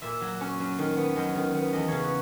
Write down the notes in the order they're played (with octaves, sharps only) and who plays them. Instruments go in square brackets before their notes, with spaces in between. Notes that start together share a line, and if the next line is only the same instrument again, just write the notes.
[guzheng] A#2 E5
F#3
C#4
F#2
D#3
B3
F#2 D#5
D#3
B3
E2 D#5
C#3 C#5
B4